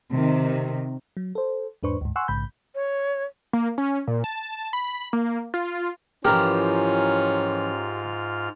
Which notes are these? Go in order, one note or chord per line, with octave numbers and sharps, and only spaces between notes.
C3 D#3
F#3
A4 C5
E2 G#2 D4 B4 C5 C#6
D2 G#2
F#5 G#5 C6 C#6 E6 F#6
A#1 G#2 C#3 B5 G6
C#5
A#3
C#4
A#2
A5
B5
A#3
F4
G#2 E3 F3 C#4 F4 G4 A#4 F6